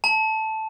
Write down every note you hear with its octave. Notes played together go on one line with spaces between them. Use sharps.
A5